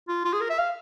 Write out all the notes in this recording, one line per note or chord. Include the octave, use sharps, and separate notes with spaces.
F4
F4
G#4
A#4
E5
F5